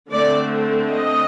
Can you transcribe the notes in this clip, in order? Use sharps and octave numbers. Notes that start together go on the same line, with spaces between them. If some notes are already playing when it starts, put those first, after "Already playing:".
D3 A3 C4 D5
D#5